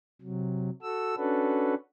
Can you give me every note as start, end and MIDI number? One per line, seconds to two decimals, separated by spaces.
0.21 0.70 48
0.21 0.70 54
0.82 1.15 66
0.82 1.15 69
0.82 1.15 88
1.17 1.74 61
1.17 1.74 62
1.17 1.74 66
1.17 1.74 69
1.17 1.74 71